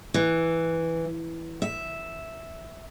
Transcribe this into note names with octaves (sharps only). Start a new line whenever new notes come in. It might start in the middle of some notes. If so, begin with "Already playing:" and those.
E3
E5